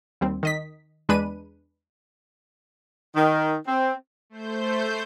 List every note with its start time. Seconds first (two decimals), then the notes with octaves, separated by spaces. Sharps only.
0.21 D#2 G3 C4
0.43 D#3 D#5 B6
1.09 E2 G#3 D4 B4 D#7
3.15 D#3
3.68 C4
4.30 A3 C5 G6